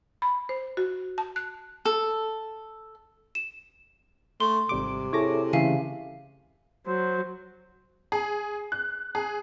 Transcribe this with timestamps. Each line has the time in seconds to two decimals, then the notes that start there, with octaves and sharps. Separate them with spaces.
0.22 B5
0.49 C5
0.77 F#4
1.18 A5
1.36 F#6
1.85 A4
3.35 E7
4.40 A3 C6
4.69 G#1 C3 G3 D6
5.13 E4 G#4 A4 C#5 D6 A#6
5.53 C#3 E3 A3 E5 F5 G#5
6.87 F#3 C5
8.12 G#4
8.72 F#6
9.15 G#4